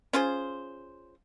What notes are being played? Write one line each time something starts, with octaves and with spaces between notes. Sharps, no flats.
C#4 F4 G#4 C5